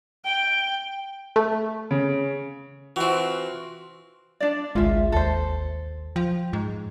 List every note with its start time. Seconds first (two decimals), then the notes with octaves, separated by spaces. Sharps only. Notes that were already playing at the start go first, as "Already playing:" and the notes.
0.25 G5
1.36 A3
1.91 C#3
2.96 E3 C4 F4 F#4
4.40 D4 D5
4.75 G#1 C#2 G#3 F4 E5
5.12 D#2 A4 C5
6.16 F3 G5
6.53 G#2